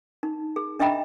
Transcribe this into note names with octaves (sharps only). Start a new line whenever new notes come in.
D#4
G#4
D4 D#5 E5 G5 A#5 B5